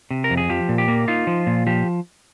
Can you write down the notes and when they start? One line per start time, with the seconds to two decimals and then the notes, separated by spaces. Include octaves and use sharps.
0.11 C3
0.24 A#4
0.30 F2
0.37 G#4
0.50 F3 G4
0.69 A#2
0.78 G4
0.88 A#3
1.08 D#4 F4
1.27 F3
1.47 A#2
1.67 F3 G4